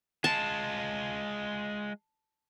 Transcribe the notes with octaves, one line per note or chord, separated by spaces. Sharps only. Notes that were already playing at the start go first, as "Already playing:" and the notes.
G#3 F4 A5